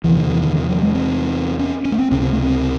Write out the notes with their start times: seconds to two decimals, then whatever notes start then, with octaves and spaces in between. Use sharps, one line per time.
0.04 E2 C3 E3
0.17 D#3
0.30 E3
0.43 D#3
0.56 E3
0.69 F#3
0.82 G#3
0.95 C4
1.59 C#4
1.85 C#4
1.92 A3
1.98 C4
2.11 C#2 C3 C#4
2.22 C4
2.32 A3
2.43 C4